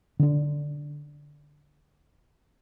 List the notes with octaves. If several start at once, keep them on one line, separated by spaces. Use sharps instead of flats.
D3 D4